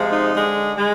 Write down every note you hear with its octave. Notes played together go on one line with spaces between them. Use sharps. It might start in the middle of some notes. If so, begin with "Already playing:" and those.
Already playing: C3 F3 G#3
D#4
D3 G#3
G#3